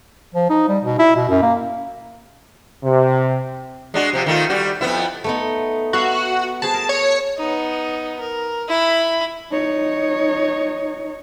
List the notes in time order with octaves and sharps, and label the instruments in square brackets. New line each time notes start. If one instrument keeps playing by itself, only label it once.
[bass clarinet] F3
D#4
G3
B2
E4
B2
F#2
A#3
[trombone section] C3
[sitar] G#3 D4 F#4
C3 F3
D#3 A3 F4
G3 F#4
F2 B3 E4
[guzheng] A3 B3 D#4
[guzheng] B3 E5 F5 [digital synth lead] F#4
[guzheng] G#4 C5 B5 [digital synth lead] A5
[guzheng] A#4
[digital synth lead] C#5
[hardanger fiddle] B3 D#4
A#4
E4 B5
[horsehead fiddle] D#4 C#5